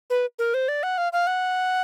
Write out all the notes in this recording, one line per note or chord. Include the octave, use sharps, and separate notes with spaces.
B4
A#4
C5
D5
F#5
F5
F5
F#5